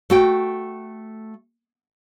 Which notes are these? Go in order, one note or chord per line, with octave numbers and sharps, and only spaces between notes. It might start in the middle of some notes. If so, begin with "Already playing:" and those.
A3 F#4 G5